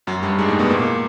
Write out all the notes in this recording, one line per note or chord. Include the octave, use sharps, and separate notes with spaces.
F#2 F#3
G2 G3
G#2 G#3
A2 A3
B2 B3
A#2 A#3